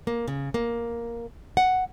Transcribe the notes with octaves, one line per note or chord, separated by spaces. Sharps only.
A#3
C#3
A#3
F#5